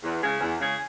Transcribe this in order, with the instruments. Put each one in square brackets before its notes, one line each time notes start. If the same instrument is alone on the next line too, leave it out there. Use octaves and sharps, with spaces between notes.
[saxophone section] E2
C#3 G#3 C#4 G#4
E2
C#3 G#3 C#4 G#4